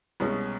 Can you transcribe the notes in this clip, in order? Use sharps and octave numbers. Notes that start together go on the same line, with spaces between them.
C2 B2 G#3 C#4